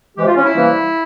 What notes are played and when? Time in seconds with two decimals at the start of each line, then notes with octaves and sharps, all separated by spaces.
0.16 C3 E3 G#3 G4
0.26 F4
0.35 C#4
0.45 E4
0.55 C3 E3 G3 A#3